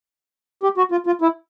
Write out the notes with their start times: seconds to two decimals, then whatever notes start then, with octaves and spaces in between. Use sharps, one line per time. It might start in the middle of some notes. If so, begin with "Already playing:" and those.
0.63 G4
0.77 F#4
0.91 F4
1.06 F4
1.21 E4